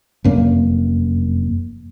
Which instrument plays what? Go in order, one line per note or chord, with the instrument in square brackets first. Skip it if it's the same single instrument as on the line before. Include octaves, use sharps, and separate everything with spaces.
[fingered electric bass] F1 F#2 A#3